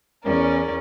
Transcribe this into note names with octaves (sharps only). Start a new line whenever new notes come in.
E2 C#4 A#4 D5